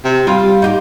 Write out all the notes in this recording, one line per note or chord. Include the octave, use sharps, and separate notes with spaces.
C3
G3 F4
D#4 F4 G4